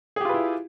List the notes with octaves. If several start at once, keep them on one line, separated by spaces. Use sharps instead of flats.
E4 F4 G4 G#4 B4